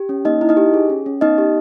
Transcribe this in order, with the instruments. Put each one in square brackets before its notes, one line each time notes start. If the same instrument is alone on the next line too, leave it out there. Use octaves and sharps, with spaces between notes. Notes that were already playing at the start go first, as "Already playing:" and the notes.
Already playing: [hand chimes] G4
C#4
A#3 D#4 D#5
E4
D#4 D#5
G4
G#4
C#4
C#4
B3 D#4 D#5
G4